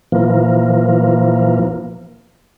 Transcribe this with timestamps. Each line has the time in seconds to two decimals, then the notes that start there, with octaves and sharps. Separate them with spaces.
0.12 A#2 E3 F3 A#3